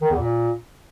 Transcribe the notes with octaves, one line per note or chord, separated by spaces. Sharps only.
D#3
E2
A#2